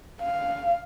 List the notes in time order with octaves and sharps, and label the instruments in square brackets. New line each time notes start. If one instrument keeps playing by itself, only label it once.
[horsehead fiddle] F5